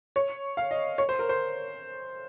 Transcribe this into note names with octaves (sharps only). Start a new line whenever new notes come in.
C#5
F5
D#5
C#5
C5
A#4
C5